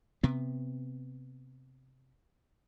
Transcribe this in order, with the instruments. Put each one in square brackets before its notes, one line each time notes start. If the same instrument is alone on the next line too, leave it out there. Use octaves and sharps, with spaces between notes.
[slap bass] C3 B3